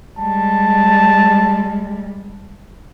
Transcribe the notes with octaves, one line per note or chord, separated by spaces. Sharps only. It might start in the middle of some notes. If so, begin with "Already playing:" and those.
G3 G#3 A5